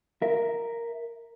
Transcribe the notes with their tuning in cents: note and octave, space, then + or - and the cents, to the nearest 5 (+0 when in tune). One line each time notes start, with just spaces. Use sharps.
A#4 +0 E5 +0